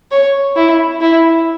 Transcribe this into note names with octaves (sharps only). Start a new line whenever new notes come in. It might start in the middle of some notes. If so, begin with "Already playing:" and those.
C#5
E4
E4